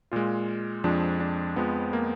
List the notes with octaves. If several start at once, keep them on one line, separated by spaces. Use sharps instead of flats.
A#2 G#3 F4
F2 F3 G#3 D4
D4
F2 F3 G#3 B3
A#3